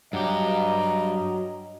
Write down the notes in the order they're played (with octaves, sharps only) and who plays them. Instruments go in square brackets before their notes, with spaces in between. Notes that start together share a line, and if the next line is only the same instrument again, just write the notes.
[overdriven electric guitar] G2 G4 [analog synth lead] F#3 [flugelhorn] D#5 [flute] A#5